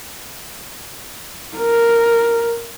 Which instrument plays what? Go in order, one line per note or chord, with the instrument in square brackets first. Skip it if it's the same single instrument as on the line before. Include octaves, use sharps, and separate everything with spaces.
[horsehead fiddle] A#4